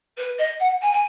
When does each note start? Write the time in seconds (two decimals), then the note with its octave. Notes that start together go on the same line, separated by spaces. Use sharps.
0.17 B4
0.38 D#5
0.59 F#5
0.81 G#5
0.92 G#5